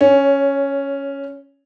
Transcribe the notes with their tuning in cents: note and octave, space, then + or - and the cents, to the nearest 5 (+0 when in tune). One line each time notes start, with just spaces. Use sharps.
C#4 +0 C#5 +20